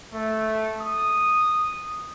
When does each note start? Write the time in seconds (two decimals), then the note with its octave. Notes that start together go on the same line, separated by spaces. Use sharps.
0.12 A3
0.81 D#6